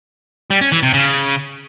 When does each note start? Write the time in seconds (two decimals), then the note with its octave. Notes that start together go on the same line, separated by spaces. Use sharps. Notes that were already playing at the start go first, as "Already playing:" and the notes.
0.50 G3
0.61 C#4
0.72 E3
0.83 C3
0.94 C#3